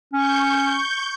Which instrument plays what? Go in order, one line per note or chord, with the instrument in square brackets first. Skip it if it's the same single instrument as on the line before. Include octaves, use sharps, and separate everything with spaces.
[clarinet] C#4 [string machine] C#6 G6